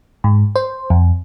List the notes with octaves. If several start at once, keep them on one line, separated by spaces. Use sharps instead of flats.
G#2
C5
F2